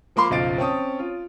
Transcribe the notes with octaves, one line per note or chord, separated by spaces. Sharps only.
F3 A#3 B5 C6 D6
F#1 B1 F3 F5 A6 D7
C4 C#4 C#5 A5 D#6
F4